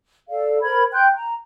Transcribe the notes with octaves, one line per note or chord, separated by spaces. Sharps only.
A4 D5 F5
A#4 C5 B5 G#6
G5 C6 F#6 G6
A#5